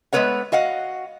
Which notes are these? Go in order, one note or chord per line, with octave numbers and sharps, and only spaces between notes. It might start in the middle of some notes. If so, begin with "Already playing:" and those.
G#3 A3 B3 B4 C#5 F#5
F#4 D#5 F5 F#5